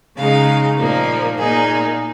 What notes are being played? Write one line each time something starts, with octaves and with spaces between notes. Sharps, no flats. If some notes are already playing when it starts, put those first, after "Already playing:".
C#3 G#3 D#4 F5
A#2 F3 A#3 D#4
A#2 A#3 D#4 G#4